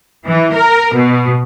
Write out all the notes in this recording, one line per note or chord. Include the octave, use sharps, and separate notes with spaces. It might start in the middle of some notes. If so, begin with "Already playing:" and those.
E3
A#4
B2